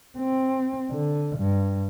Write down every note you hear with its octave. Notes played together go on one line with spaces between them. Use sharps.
C4
D3
G2